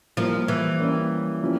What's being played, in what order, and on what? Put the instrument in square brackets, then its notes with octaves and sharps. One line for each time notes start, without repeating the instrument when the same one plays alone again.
[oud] F3 [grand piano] G3 A#3 E4 A#4
[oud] E3
[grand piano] G3 A#3 C#4 G4 A#4
F3 A#3 C#4 E4 G4